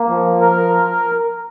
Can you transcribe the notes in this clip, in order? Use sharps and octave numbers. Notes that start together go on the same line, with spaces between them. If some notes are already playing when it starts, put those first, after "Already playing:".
Already playing: A#3
F3
A#4